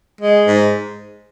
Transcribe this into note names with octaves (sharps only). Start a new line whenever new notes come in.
G#3
G#2